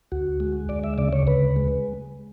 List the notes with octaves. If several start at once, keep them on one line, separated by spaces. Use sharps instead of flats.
D2 F#4
G#3
D2 D5
E5
C#3 D5
C#5
D2 B4
G#3